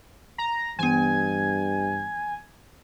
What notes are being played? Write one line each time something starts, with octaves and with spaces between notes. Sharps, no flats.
A#5
G2 E3 B3 G#5